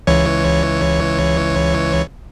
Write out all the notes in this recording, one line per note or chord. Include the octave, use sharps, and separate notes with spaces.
C#2 E3 C#5